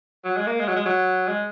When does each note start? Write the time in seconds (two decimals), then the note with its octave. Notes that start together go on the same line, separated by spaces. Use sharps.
0.25 F#3
0.36 G#3
0.47 A#3
0.59 G#3
0.68 F#3
0.76 G#3
0.86 F#3
1.28 G#3